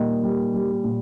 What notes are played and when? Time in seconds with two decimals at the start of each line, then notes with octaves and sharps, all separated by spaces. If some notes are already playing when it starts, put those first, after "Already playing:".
Already playing: A#2 D#3 G3
0.23 G3
0.54 G3
0.84 A#2